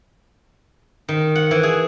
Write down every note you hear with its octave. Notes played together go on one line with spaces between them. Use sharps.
D#3
F#5
E3
G#4